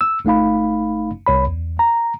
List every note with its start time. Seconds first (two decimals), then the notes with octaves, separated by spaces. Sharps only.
0.01 E6
0.25 G1 A3 D#4 F5 B5
1.27 C2 C#5 B5
1.47 E2
1.79 A#5